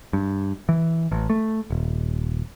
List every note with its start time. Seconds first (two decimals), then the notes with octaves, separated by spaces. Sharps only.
0.13 G2
0.69 E3
1.12 A1
1.30 A3
1.70 D#1